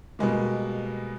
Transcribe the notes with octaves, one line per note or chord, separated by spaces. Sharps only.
B2 G3 G#3 A#3